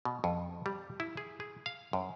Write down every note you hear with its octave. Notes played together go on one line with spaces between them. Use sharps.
B2
F2
G3
E4
G#4
G#4
F5
F#2